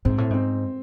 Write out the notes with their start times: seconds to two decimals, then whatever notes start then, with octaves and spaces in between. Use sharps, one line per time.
0.05 G#2 C4
0.18 A2
0.30 G#2 C4